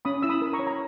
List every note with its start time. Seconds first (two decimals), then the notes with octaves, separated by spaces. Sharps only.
0.05 C#4 B5 D#6
0.22 E4 E6
0.29 B5 D#6
0.42 A#4
0.53 A#5 C#6
0.59 C#5
0.67 A#5